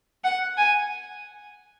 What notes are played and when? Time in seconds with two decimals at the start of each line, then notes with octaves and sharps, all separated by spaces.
0.24 F#5
0.57 G#5